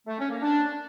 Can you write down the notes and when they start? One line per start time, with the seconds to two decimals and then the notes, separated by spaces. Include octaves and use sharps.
0.07 A3
0.19 C#4
0.30 A#3
0.42 D4